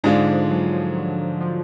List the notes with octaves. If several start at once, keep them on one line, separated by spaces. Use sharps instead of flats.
G#2 D3 G#3 D4 F4
F3
F#3
F3
F#3
F3